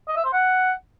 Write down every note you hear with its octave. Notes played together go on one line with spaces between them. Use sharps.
D#5
E5
C5
F#5